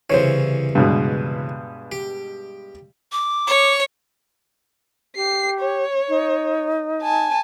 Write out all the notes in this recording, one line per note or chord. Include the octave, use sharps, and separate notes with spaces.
C2 C#3 E3 C5 C#5
G2 B2 G#3
G4
D6
C#5
G4 C7
C#5
D#4
G#5 A5